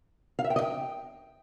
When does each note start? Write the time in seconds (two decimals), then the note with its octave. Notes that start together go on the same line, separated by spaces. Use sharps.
0.39 F5
0.44 E5
0.50 G5
0.56 D#5
0.62 G5